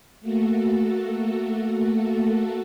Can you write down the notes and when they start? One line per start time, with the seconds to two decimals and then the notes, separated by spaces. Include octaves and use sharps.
0.21 A3 A#3 F#4 A4